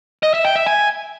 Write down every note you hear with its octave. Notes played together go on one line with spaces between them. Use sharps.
D#5
E5
G5
E5
G#5